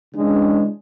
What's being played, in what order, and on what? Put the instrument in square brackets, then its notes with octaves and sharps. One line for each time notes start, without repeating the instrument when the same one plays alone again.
[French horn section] C#3 E3 G#3 D4